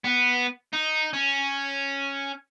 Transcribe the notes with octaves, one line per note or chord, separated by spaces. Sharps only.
B3
D#4
C#4